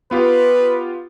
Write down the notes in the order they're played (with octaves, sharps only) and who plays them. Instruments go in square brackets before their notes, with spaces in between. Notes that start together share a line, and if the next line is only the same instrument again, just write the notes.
[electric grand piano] B3 F4 G4 [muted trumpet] B4